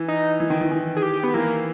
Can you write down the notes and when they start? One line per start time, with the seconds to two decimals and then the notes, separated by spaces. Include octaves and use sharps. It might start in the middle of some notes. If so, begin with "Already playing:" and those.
Already playing: E3
0.08 D#4
0.40 E3
0.50 D#3
0.61 E3
0.72 D#3
0.96 G#4
1.02 G4
1.13 G4
1.24 B3
1.34 E3 A#3